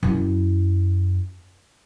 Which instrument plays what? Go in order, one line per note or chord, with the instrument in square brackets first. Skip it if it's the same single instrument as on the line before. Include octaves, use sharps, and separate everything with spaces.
[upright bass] F#2 E4